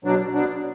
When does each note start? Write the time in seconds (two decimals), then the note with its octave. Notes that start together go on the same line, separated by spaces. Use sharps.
0.05 B2 F#3 D4
0.34 B2 F#3 D4